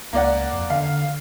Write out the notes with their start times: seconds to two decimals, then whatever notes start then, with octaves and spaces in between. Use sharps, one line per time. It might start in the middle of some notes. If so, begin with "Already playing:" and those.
0.13 C#2 A#3 D5 F#5
0.53 F2
0.70 D3 F5